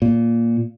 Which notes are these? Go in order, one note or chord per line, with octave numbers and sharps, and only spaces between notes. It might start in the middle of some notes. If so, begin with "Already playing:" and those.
A#2